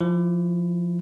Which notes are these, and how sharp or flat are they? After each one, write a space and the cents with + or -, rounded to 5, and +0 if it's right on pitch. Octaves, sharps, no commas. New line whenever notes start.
F3 +0 E4 +20